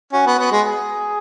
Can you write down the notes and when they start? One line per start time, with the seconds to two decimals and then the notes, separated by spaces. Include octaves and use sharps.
0.13 C#4 F#4
0.26 B3
0.39 B3
0.52 G#3
0.65 G#4